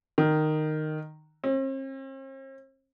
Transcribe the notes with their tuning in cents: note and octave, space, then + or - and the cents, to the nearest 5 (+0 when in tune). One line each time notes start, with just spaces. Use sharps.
D#3 -15
C4 +45